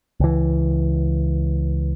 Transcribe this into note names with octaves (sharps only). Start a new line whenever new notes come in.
C#2 E3